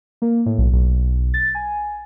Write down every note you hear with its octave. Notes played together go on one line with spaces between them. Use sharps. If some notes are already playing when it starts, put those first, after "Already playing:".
A#3
A2
B1
B1
A6
G#5